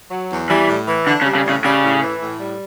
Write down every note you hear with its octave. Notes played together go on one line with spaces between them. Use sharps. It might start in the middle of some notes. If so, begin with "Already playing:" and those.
F#3
E2
E3 G3
A2
E3
D3 D4
C#3
G3
C#3
A2 C#3
C#3 G3
A2
E3
A2
G3